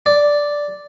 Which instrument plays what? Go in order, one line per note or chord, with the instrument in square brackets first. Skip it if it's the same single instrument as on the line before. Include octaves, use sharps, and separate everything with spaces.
[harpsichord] D5